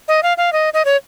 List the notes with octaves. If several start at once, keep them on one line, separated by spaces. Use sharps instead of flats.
D#5
F5
F5
D#5
D#5
C#5